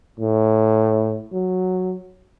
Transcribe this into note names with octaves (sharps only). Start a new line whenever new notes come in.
A2
F#3